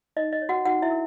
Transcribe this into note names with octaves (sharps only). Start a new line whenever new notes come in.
D#4 D#5
D#5
C#5
F#4 F#5
D#4 F#4 F#5
E4 E5
A#4